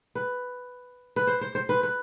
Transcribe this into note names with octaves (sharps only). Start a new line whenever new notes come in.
B4
B4
C5
C5
C5
B4
B4